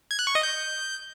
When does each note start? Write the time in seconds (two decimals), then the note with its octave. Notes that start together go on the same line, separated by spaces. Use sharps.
0.11 G#6
0.19 F#6
0.27 C#6
0.35 D#5
0.43 G6